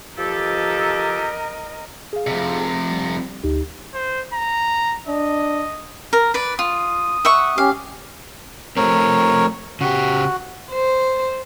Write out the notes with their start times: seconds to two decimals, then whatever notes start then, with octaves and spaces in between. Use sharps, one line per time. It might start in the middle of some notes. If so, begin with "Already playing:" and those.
0.18 F3 G4 A4 A#4 D#5
2.13 G#4 F5
2.27 F2 C3
2.91 G3
3.43 D2 D#4 G4
3.94 C5
4.33 A#5
5.08 D4 D#5
6.13 A#4
6.34 B4 D5
6.59 F4 D#6
7.25 E5 F#5 C#6
7.58 C#4 G4 F5
8.77 F3 A3 C4 A#4 C#5
9.81 C#3 F#4 G4
10.72 C5